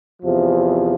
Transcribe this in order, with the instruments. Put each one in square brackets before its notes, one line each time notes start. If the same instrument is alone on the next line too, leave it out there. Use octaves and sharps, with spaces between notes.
[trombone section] E2 C3 F3